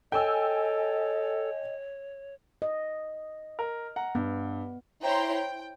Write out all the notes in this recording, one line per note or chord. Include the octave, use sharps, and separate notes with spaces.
A4 C#5 D#5 G5 G#5 E6
D#5
A#4
F#5 A#5
G2 B3
E4 C5 C#5 G5 A#5 C6
G5